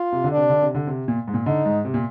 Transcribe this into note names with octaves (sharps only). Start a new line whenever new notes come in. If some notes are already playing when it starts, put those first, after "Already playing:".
Already playing: F4
C3
D3
D4
C3
D3
C3
D3
C3
A#2
G#2
A#2
D3 D#4
G#2
C3
A#2